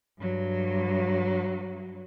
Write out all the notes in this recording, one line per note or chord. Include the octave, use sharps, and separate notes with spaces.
G2 F#3